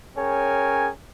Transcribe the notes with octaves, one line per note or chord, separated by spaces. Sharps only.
C#4 G#4 A#4 C#5 G5 G#5